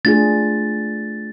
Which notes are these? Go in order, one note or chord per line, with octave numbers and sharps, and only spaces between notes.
A3 D4 F4 G#4 A6